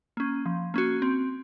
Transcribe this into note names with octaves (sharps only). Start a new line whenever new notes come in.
A#3 C#4
F3
A#3 C#4 F#4
C4